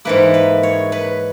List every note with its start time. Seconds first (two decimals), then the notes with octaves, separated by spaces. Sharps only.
0.05 G#2 E3 A#3 B4
0.34 B4
0.63 C#5
0.92 B4